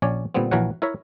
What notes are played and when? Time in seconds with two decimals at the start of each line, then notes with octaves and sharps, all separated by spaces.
0.02 A#1 C#4 C#5 D5
0.34 A#2 D3 G3 B3 C4
0.51 A#1 E3 F#4 A#4 C#5 F#5
0.82 E4 A#4 C#5 E5